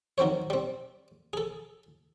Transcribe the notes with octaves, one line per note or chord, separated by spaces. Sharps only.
D#3 F#3 C4 C5 C#5
G3 C4
G#4 A4